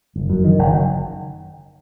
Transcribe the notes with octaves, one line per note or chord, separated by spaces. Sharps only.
F#1
F#2
D#3
F#1